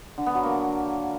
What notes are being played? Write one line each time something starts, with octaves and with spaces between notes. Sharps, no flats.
D3
B3
F#3
A#3